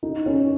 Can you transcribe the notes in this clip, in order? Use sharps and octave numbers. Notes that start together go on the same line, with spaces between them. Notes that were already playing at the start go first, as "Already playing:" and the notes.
D#4
C#4